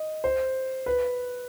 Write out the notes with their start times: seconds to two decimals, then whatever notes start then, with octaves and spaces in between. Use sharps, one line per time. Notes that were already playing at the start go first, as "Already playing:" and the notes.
Already playing: D#5
0.24 C5
0.86 B4